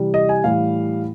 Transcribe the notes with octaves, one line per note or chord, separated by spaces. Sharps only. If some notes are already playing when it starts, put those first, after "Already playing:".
Already playing: C3 E3 G3
D#5
G#5
A2 E3 G3 F5